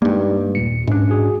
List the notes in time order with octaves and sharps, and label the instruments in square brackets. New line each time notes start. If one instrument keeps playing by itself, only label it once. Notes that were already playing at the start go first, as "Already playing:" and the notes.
[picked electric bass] G2 A#3 [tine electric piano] G3 G#3 D#4
[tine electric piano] D#2 A#2 C#7
[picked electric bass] G#2 D4 [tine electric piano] C#4
[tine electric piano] F#4 G#4